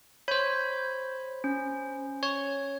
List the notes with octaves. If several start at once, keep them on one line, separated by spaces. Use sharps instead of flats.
C5 C#5 B5 G6
C#4
C#5